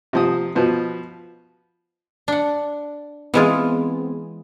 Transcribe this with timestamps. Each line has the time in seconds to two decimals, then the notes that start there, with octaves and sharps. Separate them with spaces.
0.13 C3 F3 D#6
0.55 B2 F3 B3
2.28 D4 F#5
3.34 E3 G#3 B3 C4 F4 G#4